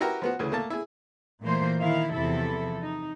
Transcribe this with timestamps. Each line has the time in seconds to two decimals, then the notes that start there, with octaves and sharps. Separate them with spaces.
0.01 E4 F#4 G4 A#4 B4
0.22 F3 B3 F#4
0.39 D2 C#3 E3
0.52 A3 A#3 A5
0.70 E4 G#4
1.43 A#2 E3 A3 A#3 C5
1.81 D#3 E4 F5
2.12 E2 C3 F3 E4 A4
2.80 D#4